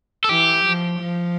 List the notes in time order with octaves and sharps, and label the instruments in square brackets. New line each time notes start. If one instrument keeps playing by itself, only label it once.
[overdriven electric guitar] A4
[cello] E3 [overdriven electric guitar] G4
[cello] F3
F3